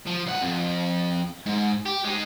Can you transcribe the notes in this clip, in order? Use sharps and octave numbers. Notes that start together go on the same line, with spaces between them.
F3
C#2 F#5
F2
G#2
G4
G#3 D#4